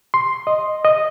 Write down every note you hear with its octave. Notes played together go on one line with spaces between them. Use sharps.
C6
D#5
D#5